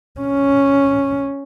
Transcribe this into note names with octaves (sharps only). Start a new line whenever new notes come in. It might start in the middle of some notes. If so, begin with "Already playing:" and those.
C#4